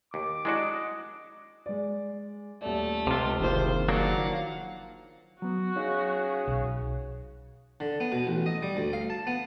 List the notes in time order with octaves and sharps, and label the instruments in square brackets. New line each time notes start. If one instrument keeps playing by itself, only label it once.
[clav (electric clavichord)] D#2 [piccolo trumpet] D6
[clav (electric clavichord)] G#3 D4 F#4 [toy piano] E4 D5 [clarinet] D#5
[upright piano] G#3 D5
[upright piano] D#1 D5 [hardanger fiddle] A3
[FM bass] C#2 [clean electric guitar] C3 F4
[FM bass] F#1 [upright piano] D#3 F3 [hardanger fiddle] C5
[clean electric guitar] F#3 A#3 D4 [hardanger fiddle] F5 F#5
[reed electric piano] F#3 B3 [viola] F#4
[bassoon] C#3 [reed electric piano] D#4
[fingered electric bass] B1
[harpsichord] D3
B3
B2
A1
D#5
G3
D2
F5
A5
B3